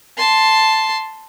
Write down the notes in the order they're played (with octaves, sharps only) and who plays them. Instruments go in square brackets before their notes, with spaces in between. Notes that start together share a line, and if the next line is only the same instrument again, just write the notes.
[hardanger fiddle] A5 C6